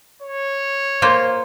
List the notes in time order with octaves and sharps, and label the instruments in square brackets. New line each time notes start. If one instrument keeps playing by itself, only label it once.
[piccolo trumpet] C#5
[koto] A#3 F4 C5